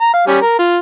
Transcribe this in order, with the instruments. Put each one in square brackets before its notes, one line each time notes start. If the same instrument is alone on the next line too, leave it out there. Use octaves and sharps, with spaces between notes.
[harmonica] A#5
F5
G3 C#4
A#4
F4